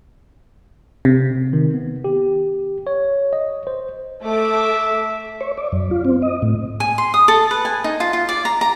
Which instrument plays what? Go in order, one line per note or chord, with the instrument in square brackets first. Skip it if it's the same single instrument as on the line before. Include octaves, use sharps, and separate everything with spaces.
[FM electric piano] C3
[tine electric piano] D#3
B3
G4
C#5
D#5
C5
[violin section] A3 D6 [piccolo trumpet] E5
[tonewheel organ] C#5
D5
F#2
F4
C4
D#5
A2
[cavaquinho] G#5
C6
D#6
A4
B4
G#5
D#4
F4
F4
D5
A#5
A#5